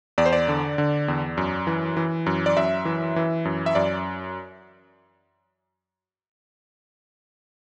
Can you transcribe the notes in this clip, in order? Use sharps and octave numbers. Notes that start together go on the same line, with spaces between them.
E2 D5
C5
D5
D3
D3
E2
F#2
E3
E3
F#2
D5
F#2 E5
E3
E3
F#2
E5
F#2 D5